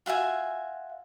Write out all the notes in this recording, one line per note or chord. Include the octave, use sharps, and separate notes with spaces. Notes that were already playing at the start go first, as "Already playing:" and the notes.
F4 F#4 E5 G#5